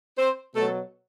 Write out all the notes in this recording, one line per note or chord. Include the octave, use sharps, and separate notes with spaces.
C4 C5
B2 F#3 A3 A4